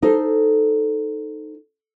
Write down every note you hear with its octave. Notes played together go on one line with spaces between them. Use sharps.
D#4 A4 C5